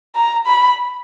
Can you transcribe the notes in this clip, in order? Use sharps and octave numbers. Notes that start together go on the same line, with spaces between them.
A#5
B5